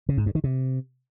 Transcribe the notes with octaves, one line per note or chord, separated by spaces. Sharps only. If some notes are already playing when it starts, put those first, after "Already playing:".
C#3
G#2
G2
D#3
C3